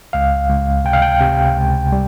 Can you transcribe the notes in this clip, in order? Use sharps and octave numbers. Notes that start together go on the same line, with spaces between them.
C#2 F5
C#2
C3 G5
F5
G5
C3
C#2
G3